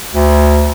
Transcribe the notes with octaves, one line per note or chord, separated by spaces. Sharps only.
D2